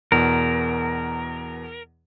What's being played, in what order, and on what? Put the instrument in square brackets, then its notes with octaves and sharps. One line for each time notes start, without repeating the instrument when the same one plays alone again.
[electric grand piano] E2 B2 [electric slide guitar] A#4